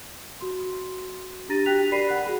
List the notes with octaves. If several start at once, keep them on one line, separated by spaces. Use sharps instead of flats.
F#4 C6
D4 G4 A#5 A6 A#6 D#7
F#4 G4 G5 F#6 B6 F7
A#4 D5 B5 B6 C7 D#7
F#5 F#6
F#4 G#4 B5